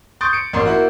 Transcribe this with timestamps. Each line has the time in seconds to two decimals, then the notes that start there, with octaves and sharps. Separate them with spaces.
0.21 C6 C#6 D#6 G6 A6 D7
0.33 C#7 D7
0.53 A1 A#3 C6
0.66 A#3 E4 F#4